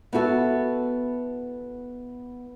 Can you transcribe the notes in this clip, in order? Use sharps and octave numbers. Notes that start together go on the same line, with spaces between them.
B3 E4 F#4 A4